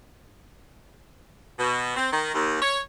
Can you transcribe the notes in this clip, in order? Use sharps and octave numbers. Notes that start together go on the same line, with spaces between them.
B2
C4
D#3
D#2
C#5